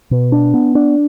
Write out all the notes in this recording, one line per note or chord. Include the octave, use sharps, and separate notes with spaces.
B2
D4
B3
D4